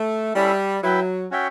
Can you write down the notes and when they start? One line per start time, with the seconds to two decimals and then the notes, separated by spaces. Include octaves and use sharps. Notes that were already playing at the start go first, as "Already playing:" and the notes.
Already playing: A3
0.35 G3 C#4 E4 A4 E5
0.83 F#3 E4 B4 E5 G5
1.31 C#4 F#4 C#5 E5 G5